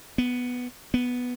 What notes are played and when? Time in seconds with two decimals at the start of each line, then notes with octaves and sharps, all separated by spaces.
0.18 B3
0.94 B3